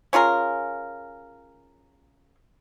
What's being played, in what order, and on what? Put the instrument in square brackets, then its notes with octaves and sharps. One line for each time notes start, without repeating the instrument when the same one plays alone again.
[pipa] C#4 F4 G#4 A#4